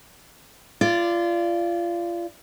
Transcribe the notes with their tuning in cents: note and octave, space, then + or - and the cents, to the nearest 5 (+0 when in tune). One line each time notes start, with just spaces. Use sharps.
F4 -25 D5 +0